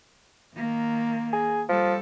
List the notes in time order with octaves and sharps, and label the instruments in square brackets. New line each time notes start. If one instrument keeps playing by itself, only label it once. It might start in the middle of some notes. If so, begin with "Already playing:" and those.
[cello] D#3 A#3
[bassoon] G#4
[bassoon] F3 [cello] G3 A4